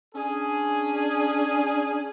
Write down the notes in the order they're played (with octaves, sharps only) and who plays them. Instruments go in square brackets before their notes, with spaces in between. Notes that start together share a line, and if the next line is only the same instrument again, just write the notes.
[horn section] C#4 D4 G#4